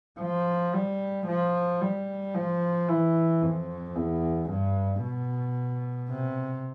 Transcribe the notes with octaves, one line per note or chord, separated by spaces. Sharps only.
F3
G3
F3
G3
F3
E3
F2
E2
G2
B2
C3